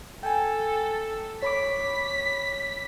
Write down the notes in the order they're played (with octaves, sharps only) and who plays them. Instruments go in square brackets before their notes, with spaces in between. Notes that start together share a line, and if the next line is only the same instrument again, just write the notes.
[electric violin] A4 [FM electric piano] G5 G#5
[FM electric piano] C#5 B5 D6 [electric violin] B6